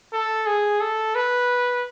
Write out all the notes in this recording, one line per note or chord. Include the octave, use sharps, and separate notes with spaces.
A4
G#4
A4
B4